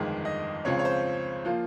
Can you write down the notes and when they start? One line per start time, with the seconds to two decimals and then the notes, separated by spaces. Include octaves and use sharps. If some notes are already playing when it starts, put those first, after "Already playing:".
Already playing: G1 F2 D#3 G#3 D#5
0.25 D#5
0.65 C#2 C#3 F3 C4 C#5
0.79 C#5
0.85 C5
1.45 F3 A#3 F4